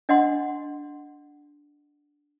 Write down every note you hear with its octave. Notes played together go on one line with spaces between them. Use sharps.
D4 D#5 F#5 C6